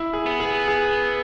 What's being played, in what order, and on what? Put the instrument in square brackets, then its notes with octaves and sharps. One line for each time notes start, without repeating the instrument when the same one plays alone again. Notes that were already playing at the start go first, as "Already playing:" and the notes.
Already playing: [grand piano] E4
G#4
[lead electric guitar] B3
[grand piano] G#4
G#4